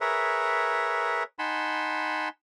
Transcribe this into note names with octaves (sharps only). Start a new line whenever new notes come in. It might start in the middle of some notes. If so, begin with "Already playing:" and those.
G#4 A#4 B4 C#5 E5
D#4 F#5 G#5 A5 B5 C6